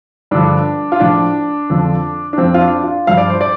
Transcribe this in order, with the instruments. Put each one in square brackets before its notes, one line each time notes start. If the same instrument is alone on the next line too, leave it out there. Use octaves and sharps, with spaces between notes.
[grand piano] G2 D3 F3 D4
F4
A2 F3 D4
F2 D3 F3
D4
F2 F3 C4
F4
D4
F4
G2 F3 F5
D5
C5
D5